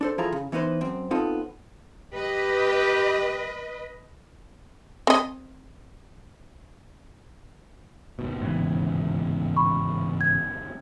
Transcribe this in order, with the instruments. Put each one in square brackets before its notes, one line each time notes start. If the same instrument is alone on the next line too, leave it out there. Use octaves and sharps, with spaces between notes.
[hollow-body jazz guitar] D4 A4 C5
F3 E4 F4 G#4 A4 A#5
C#3
E3 B3 D#4 B4 C5
F#2 C4
B3 C4 D#4 F4 A4
[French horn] G4 [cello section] B4 D#5
[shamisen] C4 D#5
[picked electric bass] G1 D#2 B2
[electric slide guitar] G#2 C#3 E3
[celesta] B5 C#6
G#6